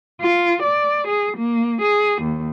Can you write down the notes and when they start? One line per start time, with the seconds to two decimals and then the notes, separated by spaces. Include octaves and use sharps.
0.21 F4
0.62 D5
1.07 G#4
1.37 A#3
1.80 G#4
2.22 D#2